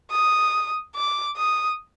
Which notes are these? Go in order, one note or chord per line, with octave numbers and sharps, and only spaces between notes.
D#6
D6
D#6